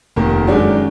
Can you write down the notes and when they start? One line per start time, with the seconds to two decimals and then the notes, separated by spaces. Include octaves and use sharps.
0.16 F1 D#2 D#3 A#3
0.47 F#2 D#3 G#3 D4 F#4